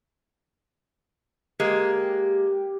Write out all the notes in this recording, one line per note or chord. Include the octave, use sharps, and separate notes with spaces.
G#3 A#3 G4